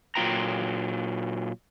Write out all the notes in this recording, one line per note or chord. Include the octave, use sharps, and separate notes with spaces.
A#2 F#3 B3 F4 G5 A#5